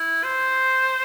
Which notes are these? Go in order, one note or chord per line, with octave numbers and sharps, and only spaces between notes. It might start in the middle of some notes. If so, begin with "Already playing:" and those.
Already playing: E4
C5